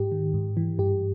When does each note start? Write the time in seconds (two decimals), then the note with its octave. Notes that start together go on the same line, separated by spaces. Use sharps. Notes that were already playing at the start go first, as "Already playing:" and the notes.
Already playing: G#2 G4
0.12 D#3
0.34 G#2
0.57 E3
0.79 G2 G4